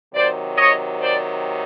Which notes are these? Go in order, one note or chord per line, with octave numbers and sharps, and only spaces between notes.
C3 D#3 F#3 C5 D5
C#5 D#5
C5 D5